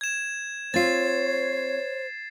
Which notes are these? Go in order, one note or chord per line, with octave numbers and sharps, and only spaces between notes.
G#6 E7
C4 F4 C5 C#5 A6 C7